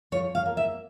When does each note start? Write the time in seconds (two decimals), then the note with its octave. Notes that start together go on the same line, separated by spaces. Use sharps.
0.12 F3 C#5
0.35 F5
0.46 A#3
0.57 E5